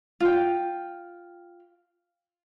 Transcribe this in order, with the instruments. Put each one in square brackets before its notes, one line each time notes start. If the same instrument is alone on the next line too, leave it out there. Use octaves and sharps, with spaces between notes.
[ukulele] F4 G5